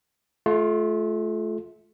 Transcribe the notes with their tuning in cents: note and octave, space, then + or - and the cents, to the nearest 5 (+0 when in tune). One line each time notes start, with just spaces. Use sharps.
A3 -30 F4 +5